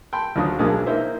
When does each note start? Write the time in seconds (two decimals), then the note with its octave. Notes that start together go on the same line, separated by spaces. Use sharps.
0.13 G5 A5 B5 C6
0.36 D2 F3 F#3 D4 F5 D#6
0.59 B1 F3 G#3 A#3 D4 D#6
0.86 A#3 D#4 E4 C5 E5